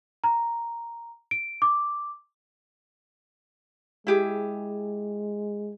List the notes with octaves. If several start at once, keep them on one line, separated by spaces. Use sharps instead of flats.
A#5
D7
D6
G#3 E4 G4 G#4